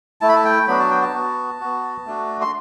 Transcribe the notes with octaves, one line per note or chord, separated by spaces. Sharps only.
A3 E4 A5
B5
A5
G5
F#3 B3 D4 F#4 B5
A5
G5
A5
B3 F#4
B3 F#4
A3 D4 F#4
C6